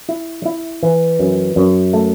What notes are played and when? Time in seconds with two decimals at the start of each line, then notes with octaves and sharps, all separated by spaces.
0.09 E4
0.45 E4
0.83 E3
1.19 F#2
1.56 F#2
1.93 A3